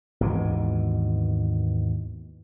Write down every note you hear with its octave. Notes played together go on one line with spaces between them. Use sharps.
G#1 D#2 B2 E3